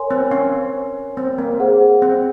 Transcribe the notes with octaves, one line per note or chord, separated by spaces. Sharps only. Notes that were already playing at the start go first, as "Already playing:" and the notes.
Already playing: A#4 C#5 G#5 C6
C4
C#4
C4
A#3
G#4 C5 F#5
C4